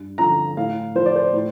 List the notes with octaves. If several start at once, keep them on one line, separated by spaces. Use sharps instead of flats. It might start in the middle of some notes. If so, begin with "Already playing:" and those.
Already playing: G2
D3 F3 A#5
A2 F5
F3 C5
D5
C5
A2